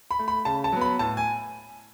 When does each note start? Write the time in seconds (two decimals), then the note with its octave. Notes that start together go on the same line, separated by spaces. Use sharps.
0.11 B5
0.19 A3
0.28 B5
0.45 C#3 A5
0.64 A5
0.72 F#3 B3
0.81 B5
0.99 A2 A5
1.17 G#5